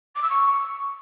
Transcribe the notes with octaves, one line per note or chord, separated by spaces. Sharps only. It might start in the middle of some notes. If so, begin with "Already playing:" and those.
D6
E6
C#6